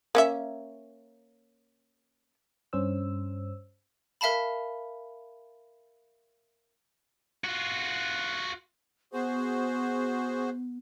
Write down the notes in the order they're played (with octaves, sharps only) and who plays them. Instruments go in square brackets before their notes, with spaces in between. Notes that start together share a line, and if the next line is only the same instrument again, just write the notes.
[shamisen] A#3 C#4 E5
[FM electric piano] G2 C#4 C5 E6
[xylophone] A#4 E5 F5 A5 B5
[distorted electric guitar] F4 F#4
[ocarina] B3 [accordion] F#4 G#4 C5